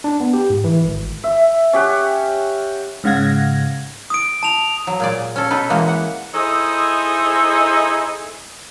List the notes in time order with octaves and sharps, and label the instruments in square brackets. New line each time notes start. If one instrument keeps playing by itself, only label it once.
[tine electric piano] D4
B3
G4
G#2
E3
G#1
[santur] E5
C#4 G4 F#5
[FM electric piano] G#2 C#3 F5 F#5 G#6 A#6
[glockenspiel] D#6 D7
A5 F7
[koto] F#3
A#2 G#4 D5
C#4 A4
B2 D#4 A4 B4
E3 G#3 A#3 F#4
F#5
[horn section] D#4 E4 G#4 A4 C5 D#5